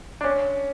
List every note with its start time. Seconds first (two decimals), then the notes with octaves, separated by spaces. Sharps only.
0.21 D4
0.24 C#4